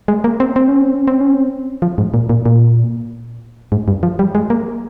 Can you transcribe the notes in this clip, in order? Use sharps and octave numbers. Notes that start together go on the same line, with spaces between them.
G#3
A#3
C4
C4
C#4
C4
C#4
C4
C#4
C4
F3
G#2
A#2
A#2
A#2
G#2
G2
F3
G3
G#3
A#3